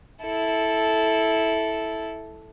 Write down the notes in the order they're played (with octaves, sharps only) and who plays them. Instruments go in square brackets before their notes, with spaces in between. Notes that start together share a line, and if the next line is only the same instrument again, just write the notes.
[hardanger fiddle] E4 A4